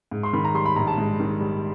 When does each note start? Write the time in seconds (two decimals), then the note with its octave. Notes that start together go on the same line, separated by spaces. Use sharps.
0.11 G#2
0.23 C6
0.33 D#3 B5
0.44 A#5
0.55 G3 C6
0.65 B5
0.76 A#1 A#5
0.87 A5
0.98 G#2
1.20 D#3
1.41 G3